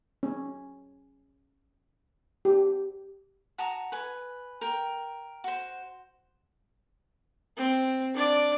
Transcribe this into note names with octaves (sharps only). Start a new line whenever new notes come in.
C#4
G4
F#4 A5 A#5 D#6
B4 G#5
A#4 G5
F#4 C5
C4
D4 D5